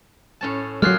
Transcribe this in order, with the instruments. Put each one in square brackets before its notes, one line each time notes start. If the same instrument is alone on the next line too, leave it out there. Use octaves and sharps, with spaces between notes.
[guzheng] A2 C#4 A5
[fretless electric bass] F#3 G#3 [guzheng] A#3 F4 G#4 [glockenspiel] F6 F#6 C7